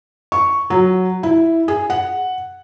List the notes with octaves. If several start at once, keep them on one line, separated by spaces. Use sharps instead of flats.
C#6
F#3
E4
G#4
F#5